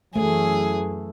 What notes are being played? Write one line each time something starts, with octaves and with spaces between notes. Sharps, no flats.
F#2 E3 A3 G#4